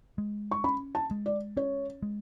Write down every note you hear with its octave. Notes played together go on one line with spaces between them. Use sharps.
G#3
C#6
C#4 B5
A5
G#3
D5
C#4 C#5
G#3